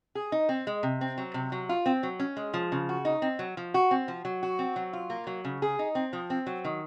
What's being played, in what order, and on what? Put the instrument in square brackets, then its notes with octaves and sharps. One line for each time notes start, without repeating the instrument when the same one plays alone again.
[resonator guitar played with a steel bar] G#4
D#4
C4
G#3
C3
C4
F#3
C3
F#3
F4
C4
F#3
C#4
G#3
F3
C#3
F#4
D#4
C4
F#3
F3
F#4
C4
F3
F#3
F#4
C4
F#3
F4
A#3
F#3
C#3
G#4
D#4
C4
F3
C4
F#3
D#3